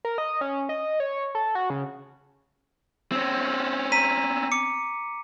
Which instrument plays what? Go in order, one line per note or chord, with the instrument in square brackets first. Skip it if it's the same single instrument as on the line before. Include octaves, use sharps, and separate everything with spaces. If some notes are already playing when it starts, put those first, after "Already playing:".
[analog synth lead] A#4
D#5
C#4
D#5
C#5
A4
F#4
C#3
[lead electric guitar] C4 C#4
[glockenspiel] A#5 B6 D#7
D6 C#7